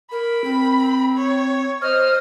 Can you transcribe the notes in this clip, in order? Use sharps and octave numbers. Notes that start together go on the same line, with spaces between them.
A#4 B5
C4
C#5
C5 D#5 F6